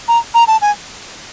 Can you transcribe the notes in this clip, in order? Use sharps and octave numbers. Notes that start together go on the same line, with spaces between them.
A#5
A#5
A5
G#5